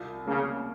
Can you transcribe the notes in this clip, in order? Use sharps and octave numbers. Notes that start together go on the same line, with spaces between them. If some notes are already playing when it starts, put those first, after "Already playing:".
Already playing: C2 F4
C#3 A#3